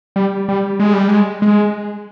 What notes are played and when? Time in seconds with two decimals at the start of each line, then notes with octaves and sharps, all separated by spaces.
0.16 G3
0.48 G3
0.79 G#3
0.93 G3
1.08 G#3
1.42 G#3